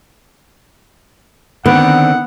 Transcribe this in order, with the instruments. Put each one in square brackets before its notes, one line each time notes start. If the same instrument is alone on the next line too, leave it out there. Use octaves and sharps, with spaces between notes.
[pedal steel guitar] D3 D#3 C4 [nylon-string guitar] B3 [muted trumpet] F#5